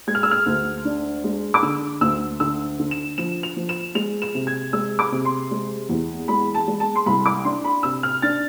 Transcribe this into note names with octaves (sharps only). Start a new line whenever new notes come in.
G#3 G#6
F6
E6
F6
D2
D4
G#3
D6
D3 E6
D2 E6
D3 E6
D3
E7
F3 E7
F7
F3
E7
G#3 F7
E7
C3
G#6
G#3 E6
D6
C3
C6
G#3
E2
G#3 B5
A5
G#3
A5
C6
C2 B5
D6
D4 C6
B5
C3 E6
F6
D4 A6